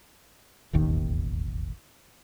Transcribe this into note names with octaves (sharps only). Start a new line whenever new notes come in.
E1 A1 D#2 D#3